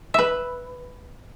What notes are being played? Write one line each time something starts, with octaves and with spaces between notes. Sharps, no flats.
B4 E5